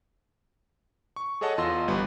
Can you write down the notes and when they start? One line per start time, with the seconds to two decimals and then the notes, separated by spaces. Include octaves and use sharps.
1.16 C#6
1.41 G#4 A4 C#5 D#5 F#5 A5
1.58 E2 F4 D#5 C6 E6 A#6
1.88 G1 G3 B3 B4